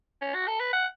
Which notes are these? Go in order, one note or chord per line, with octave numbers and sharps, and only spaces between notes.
C#4
F#4
A4
B4
F#5